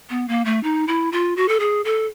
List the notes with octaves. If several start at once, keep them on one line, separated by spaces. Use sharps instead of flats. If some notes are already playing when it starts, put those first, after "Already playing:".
B3
A#3
A3
D#4
E4
F4
F#4
A4
G#4
A4